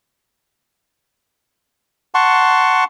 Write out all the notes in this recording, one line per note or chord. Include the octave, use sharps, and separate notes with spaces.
F#5 A5 C6 C#6